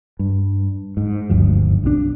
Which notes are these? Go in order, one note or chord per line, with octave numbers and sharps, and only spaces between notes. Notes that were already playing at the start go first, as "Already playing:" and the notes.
G2
G#2
F#1 D2 G2 F3
B1 D#3 D4